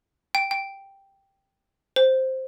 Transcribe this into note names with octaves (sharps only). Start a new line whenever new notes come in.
G5
G5
C5